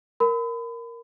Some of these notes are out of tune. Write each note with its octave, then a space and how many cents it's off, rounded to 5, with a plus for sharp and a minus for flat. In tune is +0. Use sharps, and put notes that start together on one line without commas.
A#4 +0 B5 +35